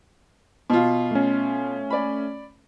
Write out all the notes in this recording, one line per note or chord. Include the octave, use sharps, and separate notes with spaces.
B2 F4
A3 C#4
D5 B5